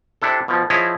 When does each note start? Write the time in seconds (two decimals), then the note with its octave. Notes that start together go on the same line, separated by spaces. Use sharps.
0.22 C3 D4 E4 A4
0.48 B2 F3
0.70 F3 E4 G#4 C#5 D#5